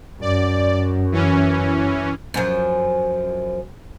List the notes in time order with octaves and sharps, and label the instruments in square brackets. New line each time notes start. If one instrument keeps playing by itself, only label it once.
[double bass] F#2 [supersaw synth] D5
[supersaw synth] E3 C#4
[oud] F#2 F3